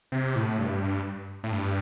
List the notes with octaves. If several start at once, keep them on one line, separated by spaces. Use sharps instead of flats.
C3
A2
G2
A2
G2